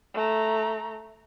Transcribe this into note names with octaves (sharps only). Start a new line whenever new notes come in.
A3 A#5